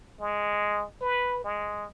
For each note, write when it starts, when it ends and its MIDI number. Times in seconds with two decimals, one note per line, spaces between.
0.20 0.84 56
1.01 1.40 71
1.44 1.85 56